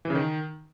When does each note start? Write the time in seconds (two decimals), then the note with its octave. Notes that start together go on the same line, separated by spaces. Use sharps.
0.05 E3
0.10 C#3
0.15 D#3